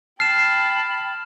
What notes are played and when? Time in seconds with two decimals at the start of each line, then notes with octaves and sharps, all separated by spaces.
0.20 G5 A5 B5 F6 C7 E7